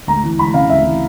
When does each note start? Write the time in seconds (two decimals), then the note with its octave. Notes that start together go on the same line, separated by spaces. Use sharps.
0.07 D2 A#5
0.24 E3
0.38 D2 B5
0.54 C#3 F5
0.70 D2 E5
0.85 E3